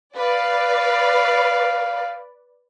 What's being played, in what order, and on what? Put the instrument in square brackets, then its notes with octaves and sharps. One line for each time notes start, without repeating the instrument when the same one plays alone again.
[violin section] B4 D5 [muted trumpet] F5